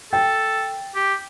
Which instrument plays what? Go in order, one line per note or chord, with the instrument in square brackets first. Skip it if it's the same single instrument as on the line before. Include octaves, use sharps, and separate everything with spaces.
[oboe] A4 [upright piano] G5
[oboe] G4